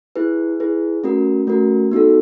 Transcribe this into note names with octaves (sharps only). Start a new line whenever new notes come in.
E4 G#4 B4
E4 G#4 B4
A3 C#4 F#4 A#4
A3 C#4 F#4 A#4
B3 D#4 F#4 A4